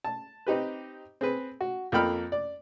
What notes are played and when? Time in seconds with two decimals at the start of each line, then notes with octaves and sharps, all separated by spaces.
0.04 A5
0.47 C4 D#4 G4 B4
1.21 C4 G#4 B4
1.61 F#4
1.92 F2 A#3 A4 G5 B5 F6
2.32 D5